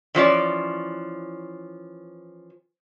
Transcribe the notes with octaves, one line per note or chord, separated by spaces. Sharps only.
E3 F3 C#4 D5